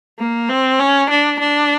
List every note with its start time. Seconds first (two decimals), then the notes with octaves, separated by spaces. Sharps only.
0.19 A#3
0.49 C4
0.80 C#4
1.10 D4
1.40 D4